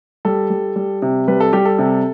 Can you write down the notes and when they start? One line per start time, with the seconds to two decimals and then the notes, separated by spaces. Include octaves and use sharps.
0.25 G3 A4
0.50 G3
0.76 G3
1.02 C3
1.28 G3 B4
1.40 A4
1.53 G3 G4
1.65 A4
1.79 C3